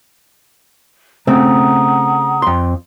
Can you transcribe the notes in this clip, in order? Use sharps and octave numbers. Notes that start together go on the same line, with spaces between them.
C#3 A3 C4 F#5 A#5 D#6
F2 C6